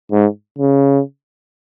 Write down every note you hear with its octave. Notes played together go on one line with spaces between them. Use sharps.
G#2
C#3